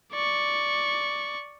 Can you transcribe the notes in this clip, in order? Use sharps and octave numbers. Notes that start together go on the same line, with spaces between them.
D5 C#6